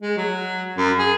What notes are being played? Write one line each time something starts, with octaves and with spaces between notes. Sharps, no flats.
G#3
F#3
F#2
G#4